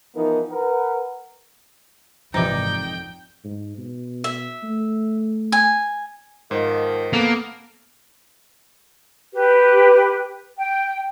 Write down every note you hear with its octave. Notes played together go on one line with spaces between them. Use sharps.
E3 F3 B3 D#4 A#4
A#4 B4 F#5
G#1 F2 C3 E3 F3 D#4 D5 G5
G#2
B2
E5
A3
G#5
G#2 D#3 F3 C5
A#3 B3 A4 B4
G4 B4
G5